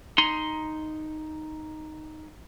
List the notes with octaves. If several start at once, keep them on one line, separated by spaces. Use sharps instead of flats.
D#4 C6